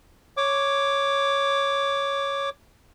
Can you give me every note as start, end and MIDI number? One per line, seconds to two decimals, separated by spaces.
0.37 2.50 73
0.37 2.50 86